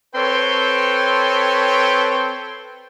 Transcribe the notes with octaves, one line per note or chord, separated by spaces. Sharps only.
C4 A4 B4 C#5 G5 C6